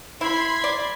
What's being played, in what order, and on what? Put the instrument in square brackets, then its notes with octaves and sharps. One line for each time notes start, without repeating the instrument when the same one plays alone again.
[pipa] E4 [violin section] B5 C6 G#6
[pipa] D5